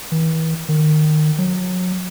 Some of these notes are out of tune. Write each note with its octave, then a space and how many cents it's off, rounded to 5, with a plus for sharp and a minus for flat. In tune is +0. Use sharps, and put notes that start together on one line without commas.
E3 -40
D#3 -20
F#3 -25